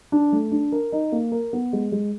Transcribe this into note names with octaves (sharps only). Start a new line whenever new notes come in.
D4
A3
D4
A#4
D#4
A#3
A#4
B3
G#3
G#3